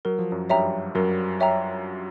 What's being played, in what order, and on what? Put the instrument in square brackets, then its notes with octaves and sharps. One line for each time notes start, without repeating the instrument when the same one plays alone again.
[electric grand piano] F#3 [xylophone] A#4
[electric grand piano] F3
F#2 F#3
[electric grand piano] G2 G3 [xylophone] C#5 E5 G5 A#5
[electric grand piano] F#2 F#3 [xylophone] A#4
[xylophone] C#5 E5 G5 A#5